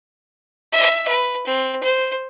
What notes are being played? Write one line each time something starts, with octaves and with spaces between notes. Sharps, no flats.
E5
B4
C4
C5